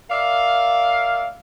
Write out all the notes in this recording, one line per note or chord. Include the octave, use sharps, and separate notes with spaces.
A#4 D5 E5 F5